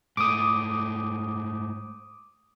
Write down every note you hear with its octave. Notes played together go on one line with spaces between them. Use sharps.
G#2 A3 D6 D#6